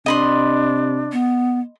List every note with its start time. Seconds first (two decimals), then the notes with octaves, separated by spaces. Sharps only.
0.06 C3 D4 D#5 B5 C6
1.12 B3